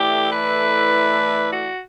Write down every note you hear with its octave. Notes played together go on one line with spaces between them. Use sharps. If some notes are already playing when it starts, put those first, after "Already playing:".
Already playing: E3 A3 E4 G4 A4 D5
B4
F#4